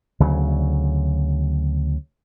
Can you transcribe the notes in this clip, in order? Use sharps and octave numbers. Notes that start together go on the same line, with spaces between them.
D2 C#3 F#3